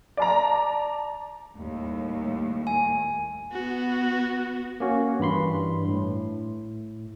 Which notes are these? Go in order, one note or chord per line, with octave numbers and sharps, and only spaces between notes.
D5 A5 A#5
D#2 A2 G3
G#5
B3 F#4
A#3 C#4 F#4
G2 E3 B5 C6
A2